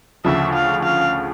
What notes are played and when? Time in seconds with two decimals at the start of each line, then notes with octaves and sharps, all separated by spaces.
0.25 D2 C#3 F3 E5
0.54 F5
0.84 F5